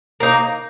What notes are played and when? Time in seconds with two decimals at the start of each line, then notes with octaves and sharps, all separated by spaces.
0.20 A#3 D#4